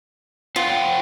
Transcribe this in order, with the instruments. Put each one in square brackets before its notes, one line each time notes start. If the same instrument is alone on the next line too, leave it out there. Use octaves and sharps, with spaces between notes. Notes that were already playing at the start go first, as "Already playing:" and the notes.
[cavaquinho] F4 [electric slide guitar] C5 F#5 G5